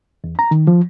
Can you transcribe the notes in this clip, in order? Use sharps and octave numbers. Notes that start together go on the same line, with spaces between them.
E2
A#5
D#3
F3